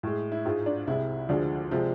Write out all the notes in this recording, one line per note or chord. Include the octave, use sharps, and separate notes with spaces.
A2 G#3
E4
G#2 G#3 F4
D4
C2 C3 G#3 E4
D2 D3 F3 G#3 D4
C3 F3 G#3